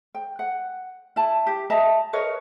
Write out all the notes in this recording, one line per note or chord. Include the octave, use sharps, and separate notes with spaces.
G5
F#5
E4 A5
G4
D#5 E5 A5 A#5
A#4 B4 C#5 D#5